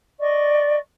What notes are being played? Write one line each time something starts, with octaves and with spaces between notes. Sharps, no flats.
D5 D#5 C#6